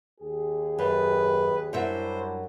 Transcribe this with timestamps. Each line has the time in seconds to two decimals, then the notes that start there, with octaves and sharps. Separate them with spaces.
0.21 D#2 G4 G#4
0.79 F#2 B4
1.73 F#2 F#3 G3 D4 E4 C5 E5